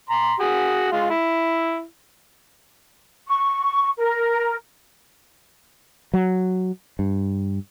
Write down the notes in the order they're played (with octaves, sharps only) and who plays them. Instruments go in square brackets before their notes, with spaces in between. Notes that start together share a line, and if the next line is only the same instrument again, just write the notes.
[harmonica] A#5 C6
F#4 G#4
G#3 F4
E4
[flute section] C#6
A#4
[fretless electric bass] F#3
G2